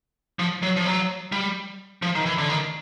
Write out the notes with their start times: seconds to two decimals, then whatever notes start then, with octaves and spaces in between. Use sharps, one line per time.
0.39 F3
0.63 F#3
0.76 F3
0.86 F#3
1.32 G3
2.02 F3
2.15 D#3
2.26 E3
2.38 D3
2.50 D#3